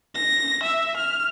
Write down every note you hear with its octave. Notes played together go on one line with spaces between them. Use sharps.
A#6
E5
F6